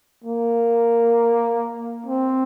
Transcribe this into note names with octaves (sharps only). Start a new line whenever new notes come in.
A#3
C4